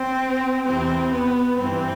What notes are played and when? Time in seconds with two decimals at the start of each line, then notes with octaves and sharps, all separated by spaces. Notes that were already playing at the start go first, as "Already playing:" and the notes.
Already playing: C4
0.65 E2 C3 E3 C4
1.13 B3
1.58 G2 E3 C4